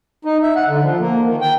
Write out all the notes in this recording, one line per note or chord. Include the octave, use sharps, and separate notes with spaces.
D#4
E5
F#5
D3
F3
A#3
D#3
G5